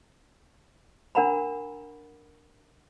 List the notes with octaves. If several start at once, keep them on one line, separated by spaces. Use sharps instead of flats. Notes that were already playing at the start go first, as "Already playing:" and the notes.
D4 A#4 F#5 A#5 B5